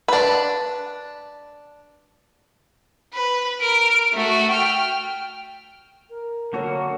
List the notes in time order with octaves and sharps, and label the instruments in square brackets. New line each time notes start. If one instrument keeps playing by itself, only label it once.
[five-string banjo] D4 B4
[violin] B4
A#4 D7
A3 F#4
G5 F6
[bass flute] A#4
[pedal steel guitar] D3 A#3 F#4 [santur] F#3 A4 E5